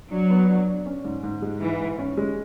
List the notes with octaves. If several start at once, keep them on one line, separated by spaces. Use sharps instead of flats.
F#3 D4
B3
D4
D4
C#4
G#2
G#2
G#3
G#2 E3
G#2
C#4
G#3